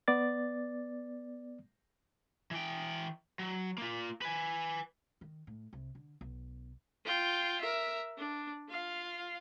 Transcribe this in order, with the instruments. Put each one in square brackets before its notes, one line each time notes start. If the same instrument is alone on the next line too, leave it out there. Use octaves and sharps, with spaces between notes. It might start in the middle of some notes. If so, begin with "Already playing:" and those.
[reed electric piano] B3 D5 A6
[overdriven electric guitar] E3 G5
F#3
A#3 F4
B4 G#5
[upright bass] D#3
A2
C2
D3
B1
[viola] F4 G5
A#4 E5
D4
F4 F5